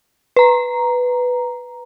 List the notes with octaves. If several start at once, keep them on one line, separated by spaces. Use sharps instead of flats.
B4 A#5